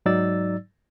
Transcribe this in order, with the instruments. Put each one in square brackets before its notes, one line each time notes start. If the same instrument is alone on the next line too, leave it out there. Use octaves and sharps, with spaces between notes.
[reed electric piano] G#2 F#3 D#4 D5 E6 A6